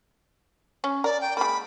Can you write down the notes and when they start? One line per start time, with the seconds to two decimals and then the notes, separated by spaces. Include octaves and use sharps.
0.84 C#4
1.04 A#4 D5
1.21 G5
1.37 G#3 A#3 B5